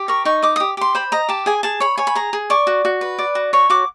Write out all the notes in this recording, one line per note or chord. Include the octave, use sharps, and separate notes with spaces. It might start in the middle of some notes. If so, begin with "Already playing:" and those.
Already playing: G4
A#4 C#6
D#4 C#6
D#5 D6
G4 D#6
G4 C6
C5 B5
D#5 A#5
G4 A5
G#4 G#5
G#4 A5
C#5 B5
C#5 G#5
B5
G#4 A#5
G#4
D5 C#6
F#4
F#4
B4
D5
F#4
C#5 C#6
F#4 D6